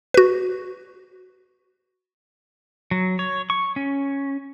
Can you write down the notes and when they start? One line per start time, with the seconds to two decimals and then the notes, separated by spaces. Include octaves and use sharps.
0.14 F#4 B4
2.91 F#3
3.19 C#5
3.50 C#6
3.76 C#4